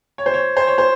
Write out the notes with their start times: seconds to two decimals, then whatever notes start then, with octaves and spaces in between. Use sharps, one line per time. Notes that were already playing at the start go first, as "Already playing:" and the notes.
0.18 C#5
0.26 C5
0.34 C#5
0.57 C5
0.67 C#5
0.78 C5